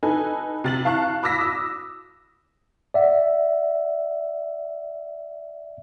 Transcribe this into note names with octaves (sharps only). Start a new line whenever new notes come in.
D#4 A4 B4 G#5
C3 A6 F#7
F5 A5 C#6 F#6
B5 D6 E6 A#6 B6
D#6 E6
D5 E5 F#5